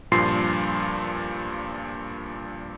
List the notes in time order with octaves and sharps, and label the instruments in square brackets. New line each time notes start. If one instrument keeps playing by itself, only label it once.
[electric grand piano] G2 A#2 F3 C6 C7